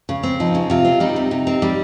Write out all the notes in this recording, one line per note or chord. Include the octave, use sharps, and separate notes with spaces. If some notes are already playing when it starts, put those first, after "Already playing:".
C#3
C4
F3 D#4
C#3
C3 F4
C4
G3 D#4
C3
C3
C4
G3